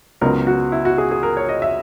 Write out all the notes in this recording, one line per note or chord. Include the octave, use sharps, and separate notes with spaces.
C#2 C#3 F#3 B3 D#4 A#4
F#4
E4
F#4
G#4
G#4
A#4
C#5
D#5
E5